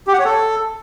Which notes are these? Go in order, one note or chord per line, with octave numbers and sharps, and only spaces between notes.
G4
F#5
C#5
A4